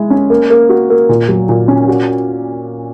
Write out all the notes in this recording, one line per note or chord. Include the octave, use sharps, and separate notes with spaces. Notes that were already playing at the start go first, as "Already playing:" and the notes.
Already playing: G#3 E4
C#4
A#3
A#3
F#4
A#3
A#2
F#3
A#2
C#4
F#4